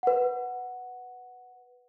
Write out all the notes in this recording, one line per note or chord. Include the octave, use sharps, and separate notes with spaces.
B4 F#5